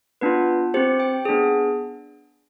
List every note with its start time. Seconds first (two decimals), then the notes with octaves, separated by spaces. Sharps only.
0.21 B3 D4 F4 B4
0.74 C4 G4 C5
1.00 G5
1.25 B3 D4 G#4